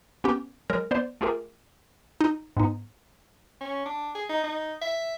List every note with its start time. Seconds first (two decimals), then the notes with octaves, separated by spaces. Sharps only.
0.24 B3 C#4 G4
0.70 F#3 G#3 A#4
0.91 B3 C5 D5
1.21 A3 F4 G4 G#4 A#4
2.21 D#4
2.57 G#2 B3 D#4
3.61 C#4
3.85 D4
4.15 G#4
4.30 D#4
4.44 D#4
4.82 E5